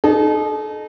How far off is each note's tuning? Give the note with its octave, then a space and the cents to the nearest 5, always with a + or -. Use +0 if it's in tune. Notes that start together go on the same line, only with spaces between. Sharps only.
D#4 -25 A4 -40